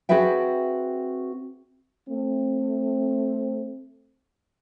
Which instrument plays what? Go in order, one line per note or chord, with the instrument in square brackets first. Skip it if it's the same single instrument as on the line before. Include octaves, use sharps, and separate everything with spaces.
[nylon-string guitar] C4 F#4 G#4 B4 E5 G5
[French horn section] A3 C4